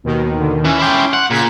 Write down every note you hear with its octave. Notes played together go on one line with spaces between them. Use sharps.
D#2 B2 D#3
D3
E3 C#4
E4 G5 C6 D6
F#5
A#2 C#3 G#6 B6